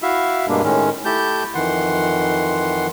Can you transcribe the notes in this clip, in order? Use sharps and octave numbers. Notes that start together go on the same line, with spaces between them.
E4 F#4 E5 F5
G2 B2 G#3 A#3 D4
A2 D#3 G#3 C#4
A3 E4 G4 A5 G6
F2 D#3 E3 F#5 C6